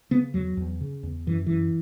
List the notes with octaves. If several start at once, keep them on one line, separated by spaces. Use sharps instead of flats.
C#3 B3
E2 F#3
E2
C#3
E2
F#2 E3
F#2 E3